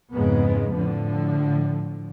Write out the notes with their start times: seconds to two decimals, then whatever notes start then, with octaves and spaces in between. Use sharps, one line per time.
0.14 F2 G#2 C#3 G#3 B3
0.74 A2 D3 F3